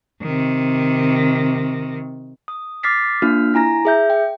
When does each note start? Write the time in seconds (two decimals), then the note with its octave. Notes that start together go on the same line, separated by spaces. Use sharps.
0.22 C3 D#3
2.48 D#6
2.83 D6 F6 A6 B6 C7
3.22 A#3 D4 F4 F6
3.54 E4 G#5 A#5 A#6
3.85 G#4 E5 G6
4.10 G5